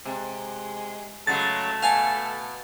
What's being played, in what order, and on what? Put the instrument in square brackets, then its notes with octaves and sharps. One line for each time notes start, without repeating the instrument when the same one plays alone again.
[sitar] C3 [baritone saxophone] G#3
[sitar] C#3 F#3 G#3 [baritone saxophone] A3 [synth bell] A6
[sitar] B2 [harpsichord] F5 G#5 A5